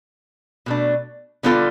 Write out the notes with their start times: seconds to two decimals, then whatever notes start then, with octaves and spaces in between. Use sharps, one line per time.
0.66 B2 A3 D4
1.43 D3 G3 B3 F4 A4